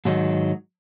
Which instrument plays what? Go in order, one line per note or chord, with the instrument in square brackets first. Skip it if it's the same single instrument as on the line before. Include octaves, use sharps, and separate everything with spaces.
[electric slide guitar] G#2 D#3 F#3 D#4